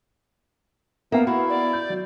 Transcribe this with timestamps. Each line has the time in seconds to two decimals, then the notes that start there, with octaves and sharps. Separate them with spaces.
1.12 A#3 B3 A#4 E5 F5 A#5
1.27 E4 F#4
1.50 D5
1.73 G6
1.90 F#3